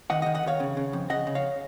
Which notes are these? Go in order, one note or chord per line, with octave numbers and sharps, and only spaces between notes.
D#3 D#5 F#5
D#3 D#5 F#5
D#5 F#5
D#3 C#5 F5
C#3
C#3
F2
C#3 D#5 F#5
C#3
C#5 F5